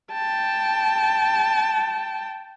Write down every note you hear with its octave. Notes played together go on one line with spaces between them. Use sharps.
G5 A5